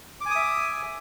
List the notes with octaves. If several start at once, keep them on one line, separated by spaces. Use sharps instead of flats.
E5 G#5 D6 D#6